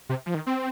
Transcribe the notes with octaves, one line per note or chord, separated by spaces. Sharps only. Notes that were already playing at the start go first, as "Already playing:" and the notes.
C3
F3
D#3
C4